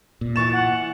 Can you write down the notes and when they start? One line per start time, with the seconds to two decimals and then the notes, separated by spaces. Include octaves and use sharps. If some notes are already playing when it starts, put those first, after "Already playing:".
0.21 A#2
0.36 E3 C#6 A6 E7
0.53 F#5